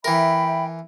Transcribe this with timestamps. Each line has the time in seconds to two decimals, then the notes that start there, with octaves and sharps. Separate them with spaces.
0.04 E3 A#4 E5 G5 B5